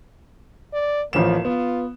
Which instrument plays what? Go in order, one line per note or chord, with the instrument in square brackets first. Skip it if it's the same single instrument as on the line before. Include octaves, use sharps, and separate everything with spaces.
[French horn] D5
[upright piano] A1 F3 E7 [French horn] A#3
[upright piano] B3 [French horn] F4